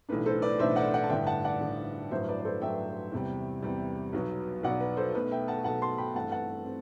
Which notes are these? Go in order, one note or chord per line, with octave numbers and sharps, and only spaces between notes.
B1 A2 E3 A3 D4 B4
A4 C5
B4 D5
B1 A2 E3 A3 D4 C5 E5
D5 F#5
D5 F#5
A5
A1 G2 D3 E5 G5
F#5 A5
D5 F#5
A1 G2 D3
A1 G2 F#3 C5 E5
B4 D5
D5
A4 C5
A1 G2 F#3 E5 G5
E2 C3 G3
E2 C3 G3
B1 B2 F#3 B3
B1 B2 F#3 B3 D5 F#5
B4
A4 C5
B1 B2 A3 B4
E5 G5
F#5 A5
B1 B2 A3 F#5 A5
A5 C6
G5 B5
G2 E3 A3 C4 F#5 A5
F#5 A5
C4